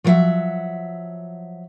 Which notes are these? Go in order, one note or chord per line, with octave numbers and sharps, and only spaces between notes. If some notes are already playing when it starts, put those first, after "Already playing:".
F3 F#3 A#4 C5 E5 F#5